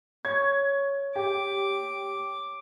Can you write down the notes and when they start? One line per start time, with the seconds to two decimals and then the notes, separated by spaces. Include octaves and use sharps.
0.25 C#5 G#6
1.16 G4 D6